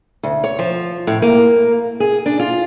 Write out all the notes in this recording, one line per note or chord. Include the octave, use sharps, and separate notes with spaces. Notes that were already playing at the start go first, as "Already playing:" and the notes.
D2
C#5
F3
A2
A#3
G#4
D4
F4